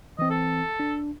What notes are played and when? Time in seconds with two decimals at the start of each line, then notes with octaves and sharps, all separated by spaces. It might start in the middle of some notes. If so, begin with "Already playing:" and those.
0.19 E3 C4 D#5
0.30 A4
0.80 D4